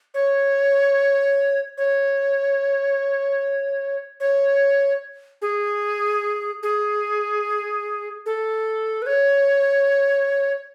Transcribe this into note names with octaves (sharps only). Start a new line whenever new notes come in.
C#5
C#5
C#5
G#4
G#4
A4
B4
C#5